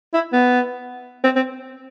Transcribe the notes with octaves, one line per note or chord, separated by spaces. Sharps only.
E4
B3
C4
C4